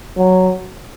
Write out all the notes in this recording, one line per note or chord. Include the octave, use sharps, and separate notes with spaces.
F#3